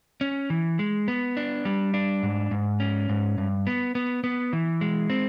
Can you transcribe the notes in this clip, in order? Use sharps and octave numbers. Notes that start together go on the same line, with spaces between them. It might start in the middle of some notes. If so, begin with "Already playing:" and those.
C#4
E3
G#3
B3
D4
G3
D4
G#2
G#2
C#4
G#2
G2
B3
B3
B3
E3
G#3
C4